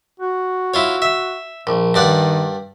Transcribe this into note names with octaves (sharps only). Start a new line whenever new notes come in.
F#4
E4 F4 C#5
E5
A#1
G2 D#3 D5 F#5